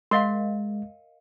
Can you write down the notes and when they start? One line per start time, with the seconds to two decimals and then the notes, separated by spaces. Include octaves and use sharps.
0.11 G#3 A#4 D#5 F5 C6